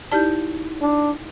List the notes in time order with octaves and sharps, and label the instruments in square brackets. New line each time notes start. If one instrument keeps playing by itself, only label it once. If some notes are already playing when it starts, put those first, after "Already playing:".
[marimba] D#4 E4 G6 [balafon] G4 D5 A5
[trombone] D4